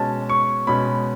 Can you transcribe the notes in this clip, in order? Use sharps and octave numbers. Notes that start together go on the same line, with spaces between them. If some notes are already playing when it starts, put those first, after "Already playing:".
Already playing: B2 G#3 C#4 A5
C#6
B2 G#3 C#4 B5